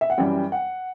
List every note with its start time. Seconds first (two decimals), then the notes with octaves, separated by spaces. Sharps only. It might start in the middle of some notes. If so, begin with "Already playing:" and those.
0.01 E5
0.10 F#5
0.18 F#2 E3 G3 G5
0.52 F#5